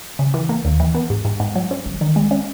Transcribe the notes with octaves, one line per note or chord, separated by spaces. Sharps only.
C#3
E3
A#3
D#2
E3
B3
G#2
G#2
G#2
F#3
C#4
G#1
D#3
G#3
C#4